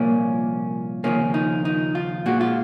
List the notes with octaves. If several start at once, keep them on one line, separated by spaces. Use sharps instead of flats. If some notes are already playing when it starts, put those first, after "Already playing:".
Already playing: C2 A#2 F3 A#3 C#4
D#2 C#3 F3 A#3 C#4
D#4
D#4
F4
A#2 G#3 F#4
F4